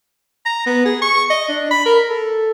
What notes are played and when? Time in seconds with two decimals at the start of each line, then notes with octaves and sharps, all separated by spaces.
0.46 A#5
0.66 B3
0.85 G#4
1.02 C#6
1.30 D#5
1.48 D4
1.71 B5
1.86 A#4
2.10 A4